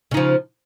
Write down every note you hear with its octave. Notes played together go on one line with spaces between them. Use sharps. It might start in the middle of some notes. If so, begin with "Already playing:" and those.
C#3 F3 D#4